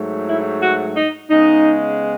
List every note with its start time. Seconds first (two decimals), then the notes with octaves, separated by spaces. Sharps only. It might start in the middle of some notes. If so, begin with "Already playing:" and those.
Already playing: G#2 F#3 A3
0.27 E4
0.61 F#4
0.96 D#4
1.30 C#3 G#3 B3 D#4